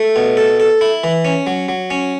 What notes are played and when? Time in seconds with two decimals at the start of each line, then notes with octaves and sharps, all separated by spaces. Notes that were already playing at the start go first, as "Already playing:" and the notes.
Already playing: A3
0.16 B2
0.37 A4
0.60 A4
0.81 E4
1.04 E3
1.25 C#4
1.47 F#3
1.69 F#3
1.90 C#4